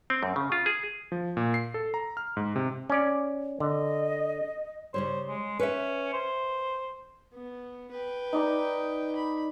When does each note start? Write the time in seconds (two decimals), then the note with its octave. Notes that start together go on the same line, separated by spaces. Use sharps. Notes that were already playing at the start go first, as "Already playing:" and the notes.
0.10 C4
0.23 F#2
0.36 C#3
0.52 F4
0.66 G#4
1.12 F3
1.37 A#2
1.54 C7
1.74 A4
1.94 A#5
2.17 F6
2.37 G#2
2.56 C3
2.90 C#4 D5
3.60 D3 D#5
4.94 C#3 G3 C5 C#5
5.29 G#3
5.59 C#4 B4 E5
6.13 C5
7.34 B3
7.91 B4 G5
8.33 D#4 D5 A#5
9.16 B5